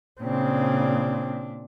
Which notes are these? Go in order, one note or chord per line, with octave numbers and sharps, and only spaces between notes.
A#2 C#3 C4 D4